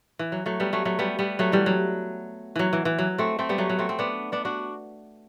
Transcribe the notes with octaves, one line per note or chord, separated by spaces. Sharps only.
E3
F#3
F#3 A3
G3 B3
F#3 A3
F#3 A3
G3 B3
G3 B3
F#3 A3
E3 G3
F#3
E3 F#3
E3
E3
F#3
A3 C4
A3 C4
G3 B3
F#3 A3
F#3
A3 C4
C4
B3 D4
B3 D4
D4 F#4